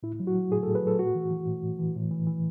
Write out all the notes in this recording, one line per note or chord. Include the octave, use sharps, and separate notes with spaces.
A2 E4
F#3
F#4
F#3
A2 G#4
A4
A2
B4
F#3 A4
A2 F#4
E3
E3
A2
A2
E3
A2
E3
E3